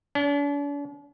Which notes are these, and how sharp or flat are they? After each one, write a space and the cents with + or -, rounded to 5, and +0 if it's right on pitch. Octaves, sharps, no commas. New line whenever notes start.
D4 -45